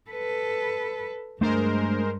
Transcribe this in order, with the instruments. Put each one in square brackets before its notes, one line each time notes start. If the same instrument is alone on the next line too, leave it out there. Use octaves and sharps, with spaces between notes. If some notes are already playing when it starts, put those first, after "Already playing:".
[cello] A4 B4
[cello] G2 [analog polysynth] G#3 A#4 C5 [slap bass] A3 D4